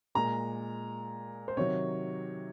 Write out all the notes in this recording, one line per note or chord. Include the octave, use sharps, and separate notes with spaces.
A#2 G#3 A#5
C5
C3 D#3 F#3 C#5